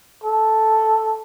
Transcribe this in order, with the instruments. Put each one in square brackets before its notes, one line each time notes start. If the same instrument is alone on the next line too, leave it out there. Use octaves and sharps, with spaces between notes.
[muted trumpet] A4